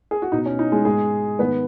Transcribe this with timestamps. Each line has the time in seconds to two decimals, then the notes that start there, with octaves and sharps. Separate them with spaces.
0.11 G#4
0.22 F#4
0.32 B2 B3 D#4
0.46 C#4
0.59 D#4
0.72 G#3 G#4
0.85 G#2 G#3 B3 G#4
1.39 G#2 D#3 G#3 B3 B4